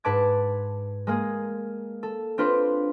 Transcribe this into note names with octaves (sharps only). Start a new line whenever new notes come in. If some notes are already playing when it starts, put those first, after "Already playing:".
G#2 B4 A5 D6 G#6
G#3 A#3 G#4
A4
C4 D4 F4 B4 C5